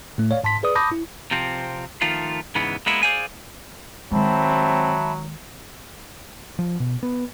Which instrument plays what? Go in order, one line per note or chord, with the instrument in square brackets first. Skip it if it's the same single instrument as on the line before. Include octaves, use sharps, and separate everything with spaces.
[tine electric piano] A2 A3
C#5 D5 F5
G#2 A5 C6 B6
G#4 B4 D5 D#6
A5 B5 D6 D#6 G6 A#6
E4
[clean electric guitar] C3 F3 C4
D#3 F3 A3 F4
G#2 C#3 E3 G#3 B3
G#3 A#3 B3 E4
G#4 C5 D5 F5 G#5
[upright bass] D#3 G#3 [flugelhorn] F#3 [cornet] C4 [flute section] E5 A5 B5
[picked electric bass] F3
B2
B3